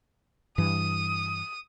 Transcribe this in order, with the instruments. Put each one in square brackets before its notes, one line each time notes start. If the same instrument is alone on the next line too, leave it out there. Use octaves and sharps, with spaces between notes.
[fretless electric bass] G2 E3 [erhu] D#6